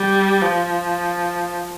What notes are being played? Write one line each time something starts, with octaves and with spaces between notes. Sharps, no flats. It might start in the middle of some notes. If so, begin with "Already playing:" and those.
Already playing: G3
F3